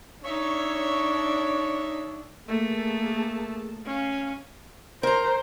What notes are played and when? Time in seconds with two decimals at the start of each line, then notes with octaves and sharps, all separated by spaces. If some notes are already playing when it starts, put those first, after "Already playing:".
0.24 D4 D#4 C#5 E5
2.48 A3 A#3 G#4 A5
3.86 C#4 F5
5.03 A#4 C5 A#5